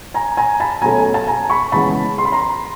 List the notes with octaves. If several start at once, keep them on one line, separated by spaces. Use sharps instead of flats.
G#5 A#5
G#5 A#5
A5 B5
B2 F#3 A3 C#4 G#5 A#5
G#5
A5
G#5 A#5
B5 C#6
C#3 E3 G#3 B3 A5 B5
C6
B5
A#5 C6